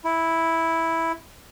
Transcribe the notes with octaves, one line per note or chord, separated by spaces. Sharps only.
E4